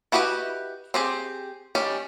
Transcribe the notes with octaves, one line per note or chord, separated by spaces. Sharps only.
E4 F#4 G4 B4 D#5
C4 G4 G#4
D#3 G3 C#4 G4 D5